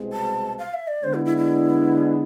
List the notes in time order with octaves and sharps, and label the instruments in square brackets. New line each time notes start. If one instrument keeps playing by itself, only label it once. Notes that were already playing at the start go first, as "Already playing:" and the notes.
Already playing: [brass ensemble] C2 B2 G#3 C4
[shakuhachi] A5
F5
E5
D5
[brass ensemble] D3 G#3 B3 D4 [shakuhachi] C5
[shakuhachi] E4
E4
E4